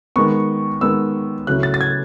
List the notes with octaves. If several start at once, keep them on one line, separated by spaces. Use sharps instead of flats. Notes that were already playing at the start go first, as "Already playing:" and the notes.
D#3 G#3 B3 C#6
D#3 G#3 B3 E6
C#3 F#3 A3 C#4 E4 F#6
A6
A6
G#6